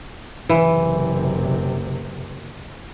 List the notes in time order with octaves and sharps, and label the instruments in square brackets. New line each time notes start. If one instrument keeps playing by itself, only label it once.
[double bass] F#1 C3 [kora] E3